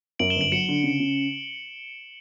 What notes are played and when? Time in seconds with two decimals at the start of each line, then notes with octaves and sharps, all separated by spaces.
0.19 F#2 D7 F#7
0.30 E7 G7
0.35 G1
0.41 D7 F#7
0.52 F#3 C#7 E7
0.69 D3
0.84 C#3
1.00 C#3